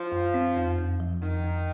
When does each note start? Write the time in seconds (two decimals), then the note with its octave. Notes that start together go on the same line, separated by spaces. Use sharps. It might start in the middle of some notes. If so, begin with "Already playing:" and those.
Already playing: F3
0.12 F#2
0.34 C4
0.57 F2
0.78 F2
1.00 F3
1.22 F2 D#3
1.44 F2